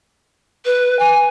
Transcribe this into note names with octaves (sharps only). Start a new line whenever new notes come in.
B4
G#5